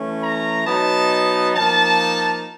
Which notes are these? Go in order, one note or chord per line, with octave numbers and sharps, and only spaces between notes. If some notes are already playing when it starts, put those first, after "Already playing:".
Already playing: E3 A3 C#4
A#5
B2 F#3 B3 D#4 A5
F3 A#3 D#4 A5